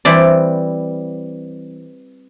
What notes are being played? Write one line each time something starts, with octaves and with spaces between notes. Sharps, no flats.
E3 G3 C4 D5